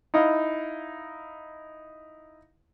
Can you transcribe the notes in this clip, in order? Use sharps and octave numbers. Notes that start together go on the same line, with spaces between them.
D#4 E4 D#5 F5